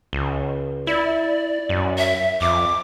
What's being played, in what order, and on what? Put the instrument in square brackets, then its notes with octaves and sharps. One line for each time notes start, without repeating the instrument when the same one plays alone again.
[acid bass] C#2
[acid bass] E4 [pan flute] D5
[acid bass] F#2
[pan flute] E5
[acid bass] F2 [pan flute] D6